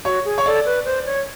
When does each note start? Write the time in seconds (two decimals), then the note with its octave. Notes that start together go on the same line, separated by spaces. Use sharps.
0.05 F#4 C#5
0.25 G#4
0.38 C#5
0.46 A4 D5
0.66 B4
0.85 C5
1.06 C#5